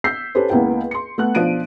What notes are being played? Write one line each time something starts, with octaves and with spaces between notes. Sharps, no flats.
E6 G6 B6 C7
C#4 G4 A4 B4 C5
C#2 A#3 B3 E4 G5
C6 C#7
A3 B3 F#6
B1 F3 D4 D7 D#7